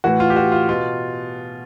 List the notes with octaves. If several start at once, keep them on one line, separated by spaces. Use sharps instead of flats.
A2 E3 F#4
F4
G4
F#4
F4
B2 F4